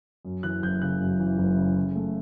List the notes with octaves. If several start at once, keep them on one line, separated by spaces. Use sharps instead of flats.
F#2
E3 F#6
F#1 G6
C#3 F#6
F#2
E3
F#1
C#3
C#3
A3